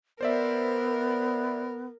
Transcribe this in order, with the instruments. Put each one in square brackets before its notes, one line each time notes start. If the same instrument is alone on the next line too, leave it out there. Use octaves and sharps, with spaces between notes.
[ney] B3 [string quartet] A#4 [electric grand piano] C5 D5 E5